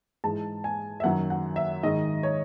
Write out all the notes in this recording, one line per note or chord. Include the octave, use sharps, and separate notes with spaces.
G#2 E3 G#3 A5
G#5
E5
F#2 D#3 F#3 F#5
F#5
E5
G#2 D#3 G#3 D#5
C#5